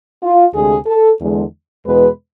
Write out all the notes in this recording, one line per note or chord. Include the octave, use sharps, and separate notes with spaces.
F4
D2 C3 G#3 G#4
A4
E2 D3 G#3
E2 B2 G#3 B4